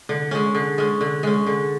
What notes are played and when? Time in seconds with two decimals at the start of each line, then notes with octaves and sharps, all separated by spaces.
0.09 D3
0.31 G#3 C#4
0.55 D3
0.78 G#3 C#4
1.01 D3
1.23 G#3 C#4
1.47 D3